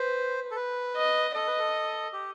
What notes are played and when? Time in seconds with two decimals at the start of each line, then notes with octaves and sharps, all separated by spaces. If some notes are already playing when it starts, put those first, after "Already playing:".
Already playing: B4 C5
0.51 A4
0.56 B4
0.96 D#5
1.35 A4 D#5
1.47 B4
1.59 A4
2.13 G4